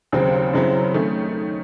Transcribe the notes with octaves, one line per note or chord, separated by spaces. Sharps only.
D#2 C#3 F#3 C4
F#2 C#3 F#3 C4 E4
D#3 A3 C#4